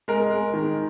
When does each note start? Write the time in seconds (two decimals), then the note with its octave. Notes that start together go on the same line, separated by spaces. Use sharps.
0.08 G#3 A#4
0.31 G#3
0.54 D#3